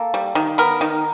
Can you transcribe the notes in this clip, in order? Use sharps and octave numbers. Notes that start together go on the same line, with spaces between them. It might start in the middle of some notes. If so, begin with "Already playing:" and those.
Already playing: A#3 A4
G3
D#3
B3 A#4
D#3